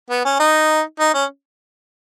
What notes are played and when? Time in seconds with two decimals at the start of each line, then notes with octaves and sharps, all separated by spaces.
0.10 B3
0.25 C#4
0.40 D#4
1.00 D#4
1.14 C#4